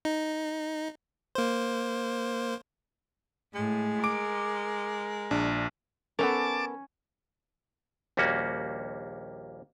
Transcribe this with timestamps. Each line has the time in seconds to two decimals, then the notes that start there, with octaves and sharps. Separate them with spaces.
0.05 D#4
1.35 A#3 C5
3.54 A2 G#3
4.04 A#4 D6 D7
5.31 A#1 D4
6.19 B3 C#4 A4 A#4 A5 D6
8.17 A#1 D#2 G3 A#3 C#4 F#4